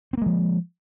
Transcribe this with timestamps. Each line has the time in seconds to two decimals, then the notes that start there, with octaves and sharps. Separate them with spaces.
0.13 C4
0.18 A#3
0.22 G#3
0.26 F3